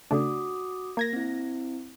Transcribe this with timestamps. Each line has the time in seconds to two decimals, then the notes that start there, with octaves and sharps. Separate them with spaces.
0.11 C#3 A3 D4 F#4 D6 D#6
0.97 A#3 G#6 A#6
1.13 C4 E4